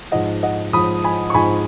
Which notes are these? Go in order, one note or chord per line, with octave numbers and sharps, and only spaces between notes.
G#2 F3 D#5 F#5
D#5 F#5
G#2 F3 B5 D#6
G#5 B5
C#6
G#2 F3 G#5 B5